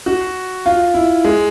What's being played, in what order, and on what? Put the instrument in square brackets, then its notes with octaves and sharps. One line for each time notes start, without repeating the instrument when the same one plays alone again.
[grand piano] F#4
F4
E4
G#3